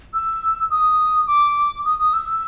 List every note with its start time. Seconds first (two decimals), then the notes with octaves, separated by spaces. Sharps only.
0.14 E6
0.70 D#6
1.27 D6
1.85 D#6
1.99 D#6
2.13 E6